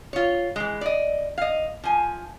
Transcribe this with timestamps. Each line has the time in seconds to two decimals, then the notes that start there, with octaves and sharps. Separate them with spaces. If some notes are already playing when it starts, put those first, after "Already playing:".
0.13 F4 C#5
0.56 E3 G#3
0.81 D5 D#5
1.38 D#5 F5
1.84 F3 G#5